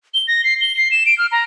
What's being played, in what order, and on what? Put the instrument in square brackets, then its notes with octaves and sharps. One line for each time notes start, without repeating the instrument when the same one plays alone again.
[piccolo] G7
A#6
C7
G7
C7
E7
D7
F6
A#5